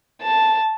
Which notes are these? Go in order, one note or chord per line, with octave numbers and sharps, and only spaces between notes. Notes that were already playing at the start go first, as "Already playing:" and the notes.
A5